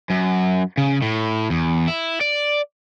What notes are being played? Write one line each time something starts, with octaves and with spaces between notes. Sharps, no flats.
F#2
C#3
A2
E2
E4
D5